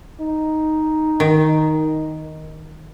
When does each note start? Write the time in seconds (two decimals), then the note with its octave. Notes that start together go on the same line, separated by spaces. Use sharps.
0.21 D#4
1.20 D#3